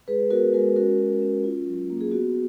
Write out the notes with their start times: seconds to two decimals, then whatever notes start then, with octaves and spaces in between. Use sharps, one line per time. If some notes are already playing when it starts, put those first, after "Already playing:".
0.08 G#3 G#4 B4
0.30 B3 F#4 A#4
0.53 G#3 F#4 A#4
0.76 C#4 F#4 A#4
0.99 F#4
1.22 C#4
1.44 F4
1.67 F#3
1.90 A#3
2.01 G#4
2.12 B3 F#4